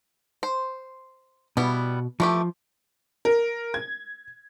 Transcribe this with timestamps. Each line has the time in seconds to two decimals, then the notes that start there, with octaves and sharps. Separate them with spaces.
0.43 C5
1.57 B2 G3 B3 E4
2.20 E3 F3 A3 G4
3.25 A#4
3.74 G#6